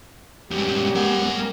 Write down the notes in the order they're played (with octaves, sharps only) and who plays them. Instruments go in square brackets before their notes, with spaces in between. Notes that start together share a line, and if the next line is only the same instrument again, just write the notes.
[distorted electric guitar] F#2 G3 [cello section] G#3 B3 C#4 [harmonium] G4
[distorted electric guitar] A#4 F#5